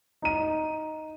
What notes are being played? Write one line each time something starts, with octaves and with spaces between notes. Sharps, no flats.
D#4 D#7